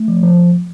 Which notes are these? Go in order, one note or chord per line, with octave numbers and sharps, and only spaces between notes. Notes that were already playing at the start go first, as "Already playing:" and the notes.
Already playing: A3
F3
F3